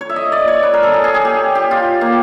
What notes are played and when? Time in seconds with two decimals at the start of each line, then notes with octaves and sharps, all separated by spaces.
0.01 C#5
0.10 E5
0.16 D#5
0.32 D5
0.48 C#5
0.63 B4
0.74 A#4
0.83 A4
0.93 G#4
1.04 G#4
1.14 G#4
1.25 G4
1.55 G4
1.71 F4
2.01 A#3